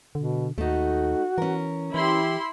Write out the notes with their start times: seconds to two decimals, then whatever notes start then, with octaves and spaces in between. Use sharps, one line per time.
0.15 B2 D3
0.58 D#2 A3 D#4 F#4
1.38 E3 C#4 A#4
1.94 E3 E4 G4 B5 C6